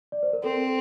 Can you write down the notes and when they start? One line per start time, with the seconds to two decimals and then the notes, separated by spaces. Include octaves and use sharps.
0.12 D5
0.23 C5
0.33 A#4
0.44 C4 A4